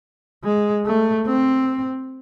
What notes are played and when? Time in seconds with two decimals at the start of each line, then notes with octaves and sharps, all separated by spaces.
0.44 G#3
0.86 A3
1.26 C4